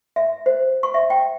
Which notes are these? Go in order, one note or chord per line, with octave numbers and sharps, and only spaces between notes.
E5
C5
C#6
E5
G5